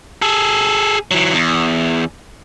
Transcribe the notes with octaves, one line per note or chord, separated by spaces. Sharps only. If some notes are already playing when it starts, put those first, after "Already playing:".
G#4 A4
E3 F#3
E2